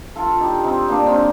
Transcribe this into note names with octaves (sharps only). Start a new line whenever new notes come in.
F4 A4
D#4 G4
C4 D#4
A#3 D4
C4 D#4